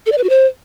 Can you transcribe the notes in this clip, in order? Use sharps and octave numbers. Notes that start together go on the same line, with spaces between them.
A4
D5
B4
F#4
C5